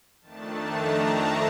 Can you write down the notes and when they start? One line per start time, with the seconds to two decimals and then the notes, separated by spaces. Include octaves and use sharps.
0.21 F2 D#3 A3 D4 A5
0.67 A#5
1.12 A#5